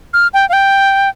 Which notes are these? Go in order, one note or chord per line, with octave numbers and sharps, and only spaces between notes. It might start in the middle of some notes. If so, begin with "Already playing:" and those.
F6
G5
F5
G5